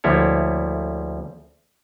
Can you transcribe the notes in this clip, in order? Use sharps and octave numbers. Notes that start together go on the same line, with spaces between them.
D2 F3 G3 A#3 E4 C#5